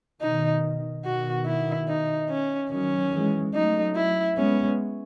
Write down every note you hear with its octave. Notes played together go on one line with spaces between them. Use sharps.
B2 D#3 D#4
B2 D#3 F#4
E4
D#4
C#4
D#3 F#3 C#4
E3 G#3
F#3 A3 D#4
E4
G#3 B3 C#4